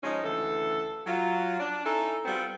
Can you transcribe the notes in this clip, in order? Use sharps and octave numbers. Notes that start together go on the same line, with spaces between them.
F3 G#3 C#4 D#4
D2 C#3 E3 A4
F#3 F4
D4
C#4 D#4 E4 A4
G3 B3 C4 F4 F#4 A4